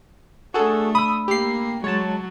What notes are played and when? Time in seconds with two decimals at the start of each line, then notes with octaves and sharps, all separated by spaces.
0.54 A3 D4 F#4 G#4 A4
0.95 B5 D#6 E6
1.28 A#3 G4 C7
1.84 F#3 G#3 C#5 A5 A6